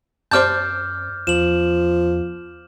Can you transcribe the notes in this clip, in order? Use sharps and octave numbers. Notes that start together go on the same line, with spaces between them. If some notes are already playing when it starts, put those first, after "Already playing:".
F#2 C5 D5 A5 D6 F6 G6
E2 F3 E7 F#7